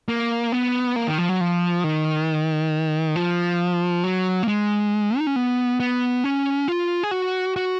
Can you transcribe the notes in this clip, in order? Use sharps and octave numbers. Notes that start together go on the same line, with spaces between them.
A#3
B3
A#3
D#3
F3
F#3
F3
D#3
F3
F#3
A#3
G#3
D#4
C#4
B3
B3
C#4
F4
G#4
F#4
F#4